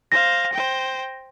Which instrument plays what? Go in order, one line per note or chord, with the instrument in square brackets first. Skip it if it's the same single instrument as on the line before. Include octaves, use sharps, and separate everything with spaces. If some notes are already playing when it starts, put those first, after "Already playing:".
[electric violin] C5 F5 [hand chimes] A#6
[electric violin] C5 G5